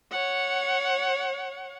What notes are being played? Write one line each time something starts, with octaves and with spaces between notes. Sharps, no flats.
C#5 F#5